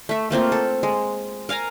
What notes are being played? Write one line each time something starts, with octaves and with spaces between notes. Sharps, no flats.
A3 E5
A3 A#3 C4 F4
A4
G#3
A#4 F5 G#5 A#5